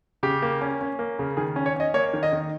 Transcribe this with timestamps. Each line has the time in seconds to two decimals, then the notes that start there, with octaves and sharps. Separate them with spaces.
0.23 C#3 G4
0.42 A#3
0.61 C#4
0.81 C#4
0.99 A#3
1.19 C#3
1.37 D#3 G#4
1.56 C#4
1.66 C#5
1.76 C#4 D#5
1.94 A#3 C#5
2.13 D#3
2.23 D#5
2.33 D#3